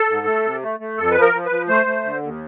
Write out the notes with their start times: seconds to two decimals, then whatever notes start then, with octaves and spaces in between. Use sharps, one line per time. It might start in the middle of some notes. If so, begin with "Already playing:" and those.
Already playing: A4
0.09 G#2
0.27 A3
0.44 C3
0.63 A3
0.80 A3
0.98 F2 A4
1.11 B4
1.16 F3
1.22 A#4
1.34 F3
1.46 B4
1.51 F3
1.68 A3 C5
1.86 A3
2.04 D3
2.22 D#2